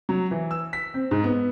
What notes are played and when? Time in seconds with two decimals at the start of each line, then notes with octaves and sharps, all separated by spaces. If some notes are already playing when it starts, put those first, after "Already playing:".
0.09 F#3
0.31 E3
0.51 E6
0.73 B6
0.94 C4
1.11 G#2
1.24 B3